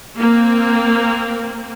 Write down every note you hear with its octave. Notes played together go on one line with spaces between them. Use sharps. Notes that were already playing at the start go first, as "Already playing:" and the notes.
A#3 C4